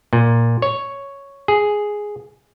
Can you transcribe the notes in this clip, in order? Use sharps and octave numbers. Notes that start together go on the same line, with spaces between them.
A#2
C#5
G#4